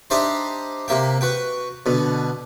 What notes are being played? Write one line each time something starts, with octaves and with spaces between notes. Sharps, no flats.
D4 D#4 G4 C5 E5 B5
C3 A#3 E5 G5
F#4 B4 G5
B2 D3